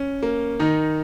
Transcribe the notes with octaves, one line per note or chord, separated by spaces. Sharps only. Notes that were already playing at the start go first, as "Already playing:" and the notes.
Already playing: C#4
A#3
D#3 D#4